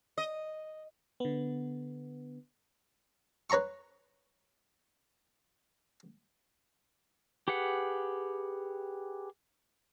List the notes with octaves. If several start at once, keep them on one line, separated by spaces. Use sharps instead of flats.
D#5
D3 B3
B4 C#5 A#5 C6 C#6
G4 G#4 B4 F#5